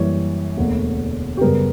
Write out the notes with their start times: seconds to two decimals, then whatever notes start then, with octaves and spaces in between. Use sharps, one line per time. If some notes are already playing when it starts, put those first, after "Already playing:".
Already playing: F#2 E3 G3 A#3 C#5
0.57 E1 D2 D3 A#3
1.37 G4
1.41 F#2 C#3 G3 B3 A#4